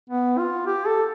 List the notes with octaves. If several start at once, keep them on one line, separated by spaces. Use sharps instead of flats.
B3
F4
G4
A4